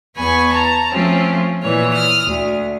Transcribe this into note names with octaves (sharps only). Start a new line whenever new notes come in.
E2 B3 G#5 B5 C#6
A5 A#5
F3 A3 C4 C#4 F4
A#2 E3 C#5
D#6 F6
D2